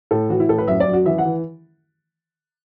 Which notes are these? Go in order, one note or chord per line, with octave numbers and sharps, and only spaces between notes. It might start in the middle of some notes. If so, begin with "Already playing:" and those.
A2 A4
E3 F#4
E4
A2 A4
B4
F#2 E5
D5
F#2
F#4
E3 E5
F#5
E3